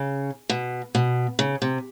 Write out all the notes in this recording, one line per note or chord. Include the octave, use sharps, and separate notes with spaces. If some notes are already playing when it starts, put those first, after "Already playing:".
Already playing: C#3
B2
B2
C#3
C3